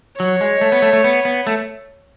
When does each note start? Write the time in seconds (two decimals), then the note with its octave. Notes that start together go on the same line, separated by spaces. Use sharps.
0.19 F#3 C#5
0.41 G#3
0.61 A3
0.72 B3
0.82 A3
0.93 A3
1.04 B3
1.25 B3
1.47 A3